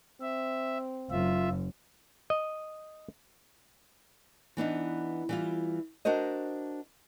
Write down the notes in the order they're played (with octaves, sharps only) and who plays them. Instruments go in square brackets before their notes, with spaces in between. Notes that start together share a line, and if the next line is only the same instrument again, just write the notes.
[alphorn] C4 [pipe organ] E5
[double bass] F#1 F#2 [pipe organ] F4 E5
[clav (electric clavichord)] D#5
[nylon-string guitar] E3 B3 D4 D#4
E3 G3 F4
D4 F#4 A#4 C5 D#5